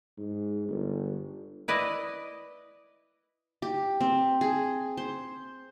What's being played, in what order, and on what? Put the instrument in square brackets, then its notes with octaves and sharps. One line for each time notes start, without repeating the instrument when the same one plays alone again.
[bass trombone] G#2
G1
[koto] E4 B4 D5 D#5
[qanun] G4
C4
G#4
C5